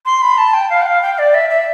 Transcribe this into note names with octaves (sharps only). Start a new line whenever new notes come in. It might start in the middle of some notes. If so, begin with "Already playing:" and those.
C6
B5
A5
G5
F5
G5
F5
G5
D5
E5
E5